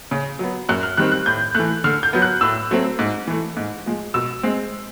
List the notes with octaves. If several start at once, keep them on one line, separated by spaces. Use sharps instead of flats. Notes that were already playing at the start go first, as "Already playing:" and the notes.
C#3
F#3 B3
F#2 F#6
F6
D#3 G3 C4 F#6
F#6
A2 G6
E3 A3 F#6
D3 F6
G6
F#3 B3
F#6
A2 E6
F#3 A3 C4
G#2
E3 A3
G#2
F3 G#3
B2 E6
G#3 C4